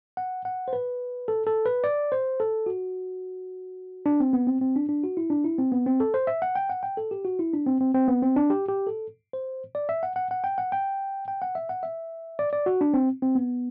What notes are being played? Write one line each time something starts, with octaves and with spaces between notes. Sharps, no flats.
F#5
F#5
C5
B4
A4
A4
B4
D5
C5
A4
F#4
D4
C4
B3
C4
C4
D4
D4
F#4
E4
D4
E4
C4
B3
C4
A4
C5
E5
F#5
G5
F#5
G5
A4
G4
F#4
E4
D4
C4
C4
C4
B3
C4
D4
G4
G4
A4
C5
D5
E5
F#5
F#5
F#5
G5
F#5
G5
G5
F#5
E5
F#5
E5
D5
D5
F#4
D4
C4
C4
B3